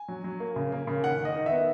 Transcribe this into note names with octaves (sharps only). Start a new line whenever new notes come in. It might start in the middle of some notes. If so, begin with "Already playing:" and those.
Already playing: G#5
F#3
F#3
A#3
C#3
A#3
C#3
D#3 F#5
D#3
D#5
D#3
B3 E5